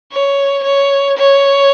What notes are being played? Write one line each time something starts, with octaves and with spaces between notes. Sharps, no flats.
C#5
C#5
C#5